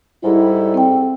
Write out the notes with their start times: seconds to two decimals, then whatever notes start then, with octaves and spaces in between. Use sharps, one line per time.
0.24 G#2 G3 E4 A4
0.74 C4 G5